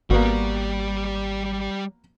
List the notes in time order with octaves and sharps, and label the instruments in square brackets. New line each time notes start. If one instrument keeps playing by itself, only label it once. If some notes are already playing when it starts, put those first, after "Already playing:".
[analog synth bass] G#1 [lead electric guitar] G3 D5 [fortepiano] A#3 B3 F#4